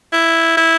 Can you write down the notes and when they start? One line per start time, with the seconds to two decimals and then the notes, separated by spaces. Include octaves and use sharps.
0.13 E4
0.57 E4